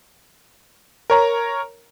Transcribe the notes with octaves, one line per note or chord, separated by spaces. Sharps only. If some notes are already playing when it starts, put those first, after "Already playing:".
A#4 C#5 A#5